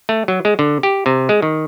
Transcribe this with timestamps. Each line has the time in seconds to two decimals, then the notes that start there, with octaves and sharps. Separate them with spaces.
0.09 A3
0.28 F#3
0.45 G#3
0.59 D3
0.83 G4
1.06 C3
1.29 G#3
1.42 D#3